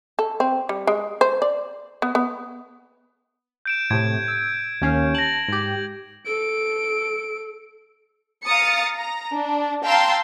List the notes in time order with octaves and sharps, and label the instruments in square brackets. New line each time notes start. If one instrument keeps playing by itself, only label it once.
[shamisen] A4
C4
G3
G#3
C5
D5
B3
B3
[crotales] G6 D7 E7
[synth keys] A2 C3 [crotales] G#6
[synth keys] E6
D#2 C#4 F5
[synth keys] A5 [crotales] A#6 F#7
[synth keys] G#2 G4
[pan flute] A4 [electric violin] D7
[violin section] F5 A#5 D#6 A6 C#7
A#5
D4
F5 G5 A5 A#5 C6 E6